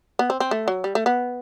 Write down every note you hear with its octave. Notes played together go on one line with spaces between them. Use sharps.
B3
C4
C4
A3
F#3
G3
A3
B3